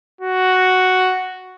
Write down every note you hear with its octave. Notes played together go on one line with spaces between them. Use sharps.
F#4